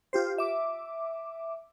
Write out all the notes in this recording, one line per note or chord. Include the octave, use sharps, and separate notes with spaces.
F4 G4 C5
E5 D6